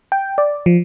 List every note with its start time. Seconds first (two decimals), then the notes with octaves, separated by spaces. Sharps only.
0.12 G5
0.38 D5
0.66 F3